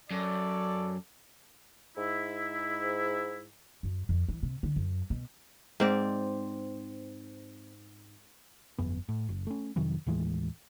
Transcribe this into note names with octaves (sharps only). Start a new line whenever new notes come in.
F#2 A4 C#5 D5
G#2 E4
F#2
F2
E3
C3
D3
F#2
B2
G#2 C4 D5
G1 F2 B3
A2
F#1
A3 C#4
F2 C3 D#3 F#3
D#2 A2 E3 G#3